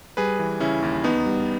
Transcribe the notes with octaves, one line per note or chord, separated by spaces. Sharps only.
G3 G#4 B4
E3
C#3 C#4 E4
D#2
E2 B3 D#4
G3